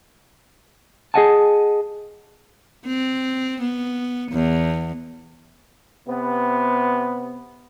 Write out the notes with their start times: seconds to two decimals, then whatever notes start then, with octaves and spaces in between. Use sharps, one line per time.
1.14 G#4 A4 D#5 F#5 G#5 A5
2.86 C4
3.61 B3
4.32 E2
6.08 C3 B3